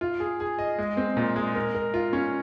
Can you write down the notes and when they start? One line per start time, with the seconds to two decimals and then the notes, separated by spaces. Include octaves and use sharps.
0.01 F4
0.20 G#4
0.40 G#4
0.59 D#5
0.79 G#3
0.97 C4
1.17 A#2
1.36 G#3
1.55 A#4
1.75 A#4
1.94 F4
2.13 C#4